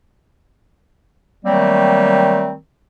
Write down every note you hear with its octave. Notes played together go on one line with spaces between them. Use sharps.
D#3 F#3 G3 A3 A#3 C4